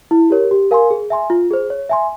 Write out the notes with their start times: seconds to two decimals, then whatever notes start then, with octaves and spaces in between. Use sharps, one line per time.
0.11 E4
0.30 G4 A#4 C#5
0.51 G4
0.71 A#4 F5 G#5 C6
0.90 G#4
1.10 E5 G#5 C6
1.30 F4
1.51 G#4 C5
1.70 C#5
1.90 E5 G#5 C6